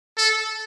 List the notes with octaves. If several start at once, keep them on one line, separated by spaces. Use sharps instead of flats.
A4